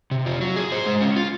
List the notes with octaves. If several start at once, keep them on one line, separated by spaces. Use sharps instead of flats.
C3
F4
F#3
G#4
C5
G#3
C#4
F4